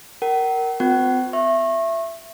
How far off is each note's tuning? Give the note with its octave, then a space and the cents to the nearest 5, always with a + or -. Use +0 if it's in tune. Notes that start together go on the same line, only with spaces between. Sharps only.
A#4 +0 F#5 +45
C4 -40 F4 +45 F#5 +45
E5 +15 C#6 -30